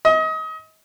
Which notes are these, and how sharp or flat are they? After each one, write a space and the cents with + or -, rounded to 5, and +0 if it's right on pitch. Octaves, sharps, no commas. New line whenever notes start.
D#5 +30